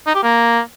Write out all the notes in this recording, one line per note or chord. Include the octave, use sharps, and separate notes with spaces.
D#4
G4
A#3